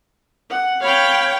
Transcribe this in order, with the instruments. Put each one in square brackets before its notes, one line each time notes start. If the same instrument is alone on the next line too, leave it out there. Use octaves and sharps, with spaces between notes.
[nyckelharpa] F#5
[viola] C#5 G5 [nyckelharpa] F5 B5